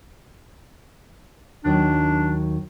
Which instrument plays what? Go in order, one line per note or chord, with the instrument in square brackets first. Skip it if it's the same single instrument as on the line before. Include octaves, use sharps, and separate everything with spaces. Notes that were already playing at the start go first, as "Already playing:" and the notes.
[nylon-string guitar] D#2 D#3 F#3 [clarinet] D4